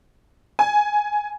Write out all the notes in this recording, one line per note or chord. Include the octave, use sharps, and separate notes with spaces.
G#5